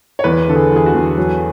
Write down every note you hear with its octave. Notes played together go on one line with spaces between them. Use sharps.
C#5
E2 B4
D3 A4
G#4
E2
G#4
F#4
E2
F#3